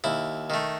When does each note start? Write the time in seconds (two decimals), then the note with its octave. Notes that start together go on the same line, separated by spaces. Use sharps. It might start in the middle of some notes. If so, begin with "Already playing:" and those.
0.04 D#2 E4
0.50 D#3 A3